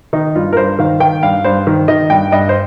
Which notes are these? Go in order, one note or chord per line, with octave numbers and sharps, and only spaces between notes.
D#3 D#4
G2 F4
A#4
G2 C5
D#3 F5
D#3 G5
G2 F5
G2 C5
D#3
D#3 D#5
G2 G5
G2 D#5
C5